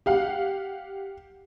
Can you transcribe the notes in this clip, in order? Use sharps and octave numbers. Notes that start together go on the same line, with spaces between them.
G4 F5 F#5